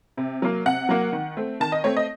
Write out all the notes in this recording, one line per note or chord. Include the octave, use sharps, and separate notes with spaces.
C3
F#3 A#3
C3 F#5
F#3 A#3
D#3
A3 C4
D#3 A5
D#5
A3 C4 C#5
D#5